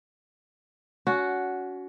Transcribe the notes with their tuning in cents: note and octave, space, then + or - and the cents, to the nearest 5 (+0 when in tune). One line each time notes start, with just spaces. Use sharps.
C#4 +35 F#4 +0